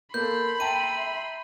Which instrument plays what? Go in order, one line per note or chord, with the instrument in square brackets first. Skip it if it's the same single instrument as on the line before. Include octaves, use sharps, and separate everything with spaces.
[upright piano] A#3 A4 [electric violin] B5 C6 [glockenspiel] G6
[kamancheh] E5 [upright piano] G5 A5 A#5 [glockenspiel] D#7